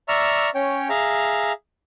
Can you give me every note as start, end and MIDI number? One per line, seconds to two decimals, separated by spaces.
0.08 0.50 74
0.08 0.50 76
0.08 0.50 82
0.08 0.50 85
0.08 0.50 88
0.08 0.50 89
0.55 0.89 61
0.55 0.89 73
0.55 0.89 79
0.89 1.52 68
0.89 1.52 76
0.89 1.52 77
0.89 1.52 82